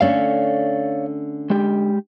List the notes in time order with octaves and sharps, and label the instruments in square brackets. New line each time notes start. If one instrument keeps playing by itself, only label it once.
[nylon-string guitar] D3 A3 C#4 [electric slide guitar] C#5 D5 F5
[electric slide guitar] G#3 G4